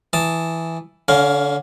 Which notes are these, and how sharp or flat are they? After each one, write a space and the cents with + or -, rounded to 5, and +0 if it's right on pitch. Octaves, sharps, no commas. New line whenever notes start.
E3 +0 A5 +0 D#6 +0
D3 -20 C#4 +25 F5 +0